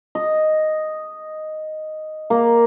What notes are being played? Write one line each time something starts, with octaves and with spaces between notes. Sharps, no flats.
D#5
A#3